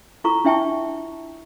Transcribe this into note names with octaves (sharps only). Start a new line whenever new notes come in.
E4 F4 A4 A#5 C#6
D4 E4 E5 G5 A5 C#6